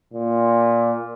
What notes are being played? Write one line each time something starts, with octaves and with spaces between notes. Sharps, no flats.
A#2